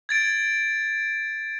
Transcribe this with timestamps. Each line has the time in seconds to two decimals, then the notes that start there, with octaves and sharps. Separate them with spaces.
0.09 G#6 A6 D7